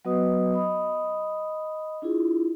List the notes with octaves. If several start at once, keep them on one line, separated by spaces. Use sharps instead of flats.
F#3 B3 F#4 B4 D#5 D#6
D#5 B5 D#6
D4 E4 F4 G#4